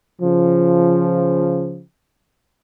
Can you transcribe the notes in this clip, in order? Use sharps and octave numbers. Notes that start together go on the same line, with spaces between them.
C#3 F3